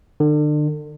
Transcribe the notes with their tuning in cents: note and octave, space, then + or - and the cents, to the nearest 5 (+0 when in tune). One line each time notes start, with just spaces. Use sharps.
D3 +35